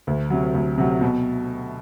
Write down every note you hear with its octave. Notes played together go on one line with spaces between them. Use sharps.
D2
C3 F#3
D2
C3 F#3
B2